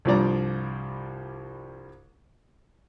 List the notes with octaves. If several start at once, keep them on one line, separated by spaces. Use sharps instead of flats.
C2 G2 F3 G3 D5 A#5